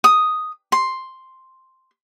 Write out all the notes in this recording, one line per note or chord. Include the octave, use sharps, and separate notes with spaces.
D#6
C6